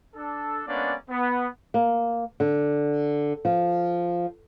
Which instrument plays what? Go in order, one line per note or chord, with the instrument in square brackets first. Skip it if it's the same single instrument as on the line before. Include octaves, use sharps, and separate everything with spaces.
[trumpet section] D4 A4
G#3 A#3 B3 C#4 D4 D5
B3
[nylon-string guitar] A#3
D3
F3